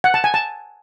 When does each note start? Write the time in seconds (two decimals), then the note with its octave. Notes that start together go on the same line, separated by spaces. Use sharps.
0.04 F#5
0.14 A5
0.24 G#5
0.34 A5